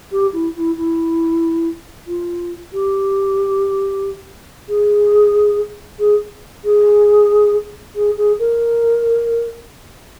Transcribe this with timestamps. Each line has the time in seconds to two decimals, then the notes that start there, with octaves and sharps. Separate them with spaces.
0.12 G4
0.33 E4
0.56 E4
0.76 E4
2.07 F4
2.73 G4
4.69 G#4
5.99 G#4
6.64 G#4
7.95 G#4
8.17 G#4
8.39 A#4